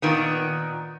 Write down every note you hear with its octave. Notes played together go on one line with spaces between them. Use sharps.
A#2 D#3 B3